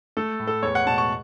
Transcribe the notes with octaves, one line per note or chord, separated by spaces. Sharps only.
A3 A4
A2
A4
E2 C#5
F#5
B2 A5
C#6